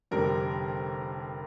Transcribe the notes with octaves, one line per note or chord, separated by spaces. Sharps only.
F1 F2 D3 G3 A#4